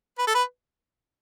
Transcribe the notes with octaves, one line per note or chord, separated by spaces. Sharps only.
B4
A4
B4